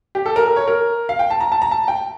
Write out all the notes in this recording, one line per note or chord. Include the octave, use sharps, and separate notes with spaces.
G4
A4
A#4
A#4
C#5
A#4
F5
G5
A5
A#5
A5
A#5
A5
G5